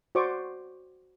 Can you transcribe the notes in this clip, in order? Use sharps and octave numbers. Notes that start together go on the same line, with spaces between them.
F#4 C5 D5 C#6 D6